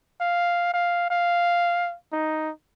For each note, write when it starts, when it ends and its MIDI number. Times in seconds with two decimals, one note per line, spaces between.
0.21 0.70 77
0.74 1.08 77
1.10 1.95 77
2.12 2.51 63